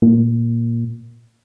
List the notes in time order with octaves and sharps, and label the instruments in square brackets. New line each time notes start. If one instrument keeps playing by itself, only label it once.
[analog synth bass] A#2